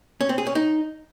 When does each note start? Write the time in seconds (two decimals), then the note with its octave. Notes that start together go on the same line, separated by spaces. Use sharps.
0.21 C#4
0.29 C4
0.38 G#4
0.47 C#4
0.55 D#4